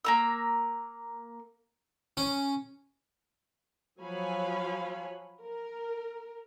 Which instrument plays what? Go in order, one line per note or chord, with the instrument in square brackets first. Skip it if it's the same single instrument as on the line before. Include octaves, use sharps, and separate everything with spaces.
[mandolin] A#3 A#5 E6
[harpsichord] C#4
[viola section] F3 F#3 C#5 F5 G#5 B5
A#4